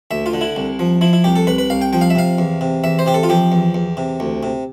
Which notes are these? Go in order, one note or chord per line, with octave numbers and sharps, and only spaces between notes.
D2 E5
F4
D3
E4
C2
F3
F3 E4
E4
C2 G4
A4
C2 B4
B4
C2 F5
G5
F3 G5
F5
E5
C3 F5
E2
C3
E2 E5
C5
C3 G4
A4
F4
F3 G4
E2
E2
C3
D2
C3